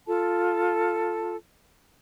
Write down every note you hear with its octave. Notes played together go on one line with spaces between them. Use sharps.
F4 A4 A5